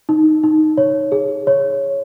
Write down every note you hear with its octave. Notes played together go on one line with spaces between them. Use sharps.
D#4
D#4
C#5
G#4
C#5